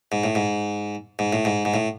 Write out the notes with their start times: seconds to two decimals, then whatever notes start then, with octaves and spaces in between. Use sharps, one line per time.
0.12 G#2
0.24 A2
0.35 G#2
1.19 G#2
1.33 A2
1.45 G#2
1.65 G#2
1.74 A2